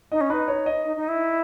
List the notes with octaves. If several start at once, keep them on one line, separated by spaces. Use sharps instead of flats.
D#4 D#5
C#4
D#4 B4
C#5
D#5
D#4
D#4
E4